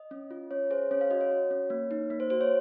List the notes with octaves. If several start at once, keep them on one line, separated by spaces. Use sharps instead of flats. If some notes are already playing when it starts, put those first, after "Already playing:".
Already playing: D#5
C#4
F4
C#4 C#5
G#4 C5
C#4 C#5
F5
F#4 D#5
C#5
F#4
C#4
A#3
D#4
A#3
C5
F#4 C5
C#5